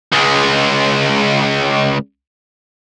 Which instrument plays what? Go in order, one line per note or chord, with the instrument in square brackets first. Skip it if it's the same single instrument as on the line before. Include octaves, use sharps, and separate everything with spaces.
[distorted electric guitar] C#2 G#3